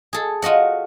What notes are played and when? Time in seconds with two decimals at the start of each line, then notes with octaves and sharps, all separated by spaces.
0.13 G#4 A4
0.42 F4 F#4 D#5 F#5